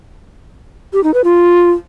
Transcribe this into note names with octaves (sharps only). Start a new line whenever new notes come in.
G4
D#4
B4
F4